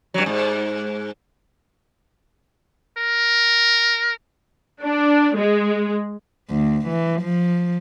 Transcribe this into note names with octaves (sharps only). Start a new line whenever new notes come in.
G2 F#3
G#2
A#4
D4
G#3
D2
E3
F3